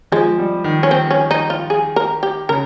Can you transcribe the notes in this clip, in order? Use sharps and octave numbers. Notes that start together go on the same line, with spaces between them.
F3 G#3
G3
D#3
C#4
C4
C#4
D#4
F4
G#4
A#4
G4
C#3 A#4